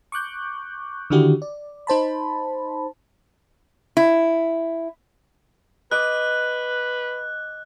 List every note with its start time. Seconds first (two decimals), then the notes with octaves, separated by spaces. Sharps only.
0.12 C#6 D6 F#6 G6
1.10 D3 D#3 D4 E4 F#4 G4
1.42 D5
1.87 D#4 C5 A5 B5
3.97 E4
5.91 B4 D#5 D6 F#6